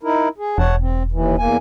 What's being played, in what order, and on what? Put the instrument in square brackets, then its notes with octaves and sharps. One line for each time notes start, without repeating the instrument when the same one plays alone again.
[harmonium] D#4 E4 A#4
G#4
[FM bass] E1 [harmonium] C#5 F#5 A5
[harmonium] C4
D#2 E3
E2 A#3 G#5